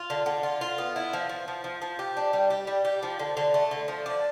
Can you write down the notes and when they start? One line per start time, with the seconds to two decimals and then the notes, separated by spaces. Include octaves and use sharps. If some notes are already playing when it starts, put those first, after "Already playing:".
Already playing: F4
0.10 D3
0.26 D3
0.43 F4
0.61 F4
0.78 B3
0.96 E4
1.13 F3
1.29 F3
1.48 F3
1.64 F3
1.82 F3
1.99 G4
2.17 D4
2.33 G3
2.50 G4
2.67 G3
2.85 G4
3.03 F3
3.19 D3
3.37 D3
3.54 A3
3.71 D3
3.88 F3
4.06 D4